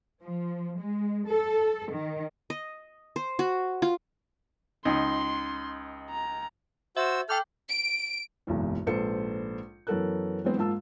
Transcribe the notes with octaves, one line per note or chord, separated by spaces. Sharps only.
F3
G#3
A4
D#3
D#5
C5
F#4
F4
C#2 D#4 C6
A#5
F#4 C5 E5 E6
A4 G5 D6 F6 G6
D7
F#1 B1 E2 G#2
A#1 G#2 A4 B4 C5 C#7
F#2 E3 B3 A4 A#4 F#6
E3 F#3 G#3 B3 C4
G#2 A#3 F4 A5 E6